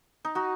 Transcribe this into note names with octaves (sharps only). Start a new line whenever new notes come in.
D#4
D#4 F#4